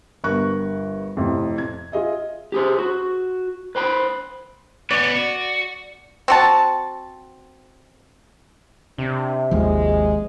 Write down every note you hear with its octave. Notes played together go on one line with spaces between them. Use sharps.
G1 G2 A#4 C#6 F#6
F2 A2 C3
G#6
F4 G#4 D#5 E5
G4 G#4 C5
F#4
B4 C5 G5 B5
B3 C#4 D5
F#4
C4 F#4 A5
C3 D4
G#1 D#2 F3 G#3